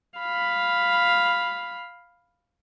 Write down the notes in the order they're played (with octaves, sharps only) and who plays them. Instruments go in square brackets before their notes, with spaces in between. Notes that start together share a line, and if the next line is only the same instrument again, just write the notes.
[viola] F5 B5